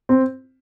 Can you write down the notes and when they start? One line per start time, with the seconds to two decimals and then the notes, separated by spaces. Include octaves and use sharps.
0.09 C4